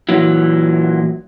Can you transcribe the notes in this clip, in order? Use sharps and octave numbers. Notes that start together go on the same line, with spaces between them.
A#2 E3 F#3